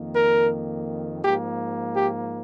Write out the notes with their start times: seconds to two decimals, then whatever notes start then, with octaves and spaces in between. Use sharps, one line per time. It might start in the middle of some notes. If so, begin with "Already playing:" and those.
Already playing: F2 D#3 A#3
0.15 A#4
1.24 G#2 F3 A#3 G4
1.95 G4